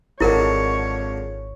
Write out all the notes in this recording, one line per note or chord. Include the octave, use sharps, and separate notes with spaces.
G#1 F2 G#2 D3 E4 A#4 C#5